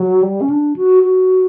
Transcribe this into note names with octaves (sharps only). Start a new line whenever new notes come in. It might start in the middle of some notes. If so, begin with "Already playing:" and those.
Already playing: F#3
G3
C#4
D4
F#4
F#4